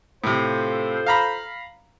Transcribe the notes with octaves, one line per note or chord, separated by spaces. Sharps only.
A2 C3 F4 A4 C5
F5 A#5 B5